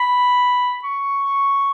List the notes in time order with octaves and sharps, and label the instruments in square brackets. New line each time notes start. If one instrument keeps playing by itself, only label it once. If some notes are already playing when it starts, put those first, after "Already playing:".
Already playing: [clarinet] B5
C#6